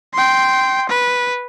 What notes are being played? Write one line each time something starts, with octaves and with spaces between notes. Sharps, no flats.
G5 C6
B4